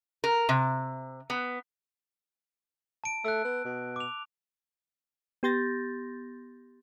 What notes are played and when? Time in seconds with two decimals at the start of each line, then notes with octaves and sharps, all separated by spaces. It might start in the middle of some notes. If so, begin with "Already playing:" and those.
0.24 A#4
0.49 C3
1.30 B3
3.04 A5 D7
3.25 A3 E6 F#6
3.45 B3
3.65 B2
3.96 D6 F7
5.43 B3 G4 C6 G6 A6 A#6